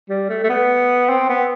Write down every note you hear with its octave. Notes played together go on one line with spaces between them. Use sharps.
G3
A3
A3
B3
C4
B3